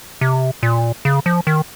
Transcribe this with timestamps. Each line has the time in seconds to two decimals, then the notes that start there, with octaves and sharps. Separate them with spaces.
0.21 C3
0.63 A#2
1.05 C#3
1.26 F3
1.47 D#3